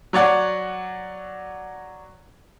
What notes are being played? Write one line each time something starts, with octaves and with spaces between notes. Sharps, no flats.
F#3 C#5 D5 F#5